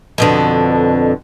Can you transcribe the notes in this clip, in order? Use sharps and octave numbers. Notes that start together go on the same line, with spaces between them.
F2 B2 D3